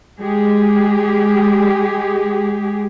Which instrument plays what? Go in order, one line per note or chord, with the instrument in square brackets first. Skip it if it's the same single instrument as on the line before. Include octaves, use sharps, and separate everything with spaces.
[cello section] G#3 G4 G#4